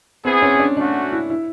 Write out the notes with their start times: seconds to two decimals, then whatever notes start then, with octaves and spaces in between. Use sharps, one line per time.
0.25 B3 C4 E4 G#4
0.42 C#4
0.59 D4
0.77 A3 C#4 D4 F#4
1.13 E4
1.30 E4